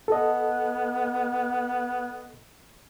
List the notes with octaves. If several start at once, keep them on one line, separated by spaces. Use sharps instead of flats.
B3 A4 D#5